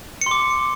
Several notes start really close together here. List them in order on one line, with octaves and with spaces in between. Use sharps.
C#7 C6 D6